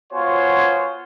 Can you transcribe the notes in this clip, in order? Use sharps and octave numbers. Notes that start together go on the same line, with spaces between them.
B3 F4 F#4 C5 C#5 G#5